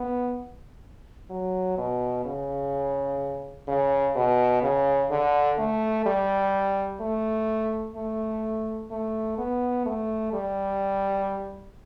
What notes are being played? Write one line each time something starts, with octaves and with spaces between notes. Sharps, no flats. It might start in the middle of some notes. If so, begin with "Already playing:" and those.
Already playing: B3
F#3
B2
C#3
C#3
B2
C#3
D3
A3
G3
A3
A3
A3
B3
A3
G3